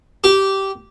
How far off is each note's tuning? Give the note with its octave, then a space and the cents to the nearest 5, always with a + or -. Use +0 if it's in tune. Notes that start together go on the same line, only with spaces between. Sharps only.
G4 -15